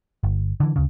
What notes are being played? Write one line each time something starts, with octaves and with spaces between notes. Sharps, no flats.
G1
D3 E3
D2 C#3